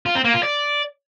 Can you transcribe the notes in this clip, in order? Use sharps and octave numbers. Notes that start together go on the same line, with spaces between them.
F4
C4
A#3
F4
D5